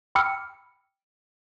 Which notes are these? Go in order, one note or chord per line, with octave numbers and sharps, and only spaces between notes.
G5 B5 D6 E6 F6 C#7